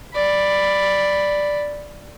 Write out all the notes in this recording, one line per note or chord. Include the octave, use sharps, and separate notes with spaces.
D5 B5